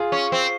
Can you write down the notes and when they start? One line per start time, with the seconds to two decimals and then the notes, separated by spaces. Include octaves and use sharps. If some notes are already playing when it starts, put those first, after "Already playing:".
Already playing: F4 G#4
0.12 C#4
0.32 C4